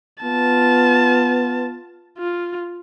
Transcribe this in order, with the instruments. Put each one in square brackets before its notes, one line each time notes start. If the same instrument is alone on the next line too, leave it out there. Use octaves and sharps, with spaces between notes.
[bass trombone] B3 [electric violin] F4 A5
[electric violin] F4